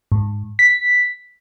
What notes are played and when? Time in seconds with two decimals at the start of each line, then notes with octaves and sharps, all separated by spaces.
0.12 G#2
0.59 B6